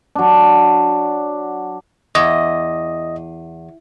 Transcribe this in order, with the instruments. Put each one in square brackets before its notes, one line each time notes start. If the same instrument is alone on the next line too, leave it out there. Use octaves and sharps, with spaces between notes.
[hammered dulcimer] F#3 D4
[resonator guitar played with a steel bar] E2 [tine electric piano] D#5